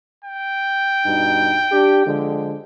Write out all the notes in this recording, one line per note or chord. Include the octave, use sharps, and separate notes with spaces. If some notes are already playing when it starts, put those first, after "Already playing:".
G5
G2 B2 D#4
D4 G4
D3 F3 G#3